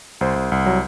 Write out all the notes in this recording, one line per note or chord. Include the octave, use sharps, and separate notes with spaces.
C2 C5
C2
C2
F#3